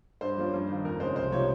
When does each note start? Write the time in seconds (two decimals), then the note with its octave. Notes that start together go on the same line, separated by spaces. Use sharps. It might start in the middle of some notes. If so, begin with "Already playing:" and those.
0.21 G2 C5
0.38 F3 A#3 C#4
0.53 G2
0.69 D#3 A#3
0.85 F2 A#4
1.00 C#3 G#3 C#4 C5
1.16 C2 C5
1.32 C3 F3 A#3 D#4 C#5